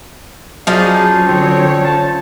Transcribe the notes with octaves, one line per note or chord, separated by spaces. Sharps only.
F3 F#3 C#4 D#4 G#4 D5
D3 C4 C#5
A5